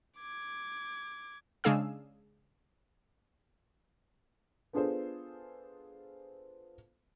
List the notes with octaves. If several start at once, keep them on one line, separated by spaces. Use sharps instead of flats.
D6 G#6
C#3 G#3 D4 G#4 F5 E6
B3 D4 F4 G#4 A4 C5